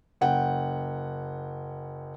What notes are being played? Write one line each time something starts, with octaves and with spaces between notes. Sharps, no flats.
F#1 F#5 G5